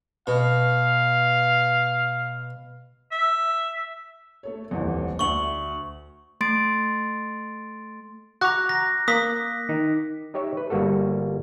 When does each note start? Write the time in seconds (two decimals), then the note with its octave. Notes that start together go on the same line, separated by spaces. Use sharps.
0.27 B2 F5
3.12 E5
4.43 A3 A4 C#5
4.71 D#1 A1 F2
5.19 D2 E5 C#6 F#7
6.41 A3 C6 A6 D7
8.41 F#4 A#5 D6 F#6
8.69 A#6
9.08 A#3 D#6 B6
9.69 D#3
10.34 D#4 G4 C#5 E5
10.57 B4
10.70 G1 G3 A#3 F#4 A4